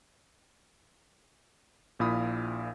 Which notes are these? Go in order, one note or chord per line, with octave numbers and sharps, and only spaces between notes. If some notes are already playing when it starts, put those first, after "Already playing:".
A#1 A#2 E4 F5 B5 D#6